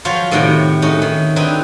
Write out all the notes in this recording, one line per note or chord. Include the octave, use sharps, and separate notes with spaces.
F3 F#3 F4 C5 C#5 F5
A2 C3 D#3 F#4 D5 G5
A3 C#4 D#4 F#4
D#3
D3 C4 D#4 B4 G#5 B5